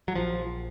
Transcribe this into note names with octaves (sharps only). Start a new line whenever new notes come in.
F#3
A#1 F3